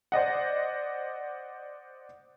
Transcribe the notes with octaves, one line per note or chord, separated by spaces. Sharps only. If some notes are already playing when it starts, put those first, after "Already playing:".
C5 D5 D#5 F#5